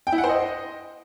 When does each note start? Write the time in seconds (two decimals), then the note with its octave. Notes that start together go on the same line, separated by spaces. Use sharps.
0.07 G5
0.12 E4
0.18 F#5
0.24 C5
0.29 D#5